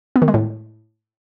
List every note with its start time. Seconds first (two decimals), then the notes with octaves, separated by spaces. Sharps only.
0.16 B3
0.22 D#3
0.28 G#3
0.34 A2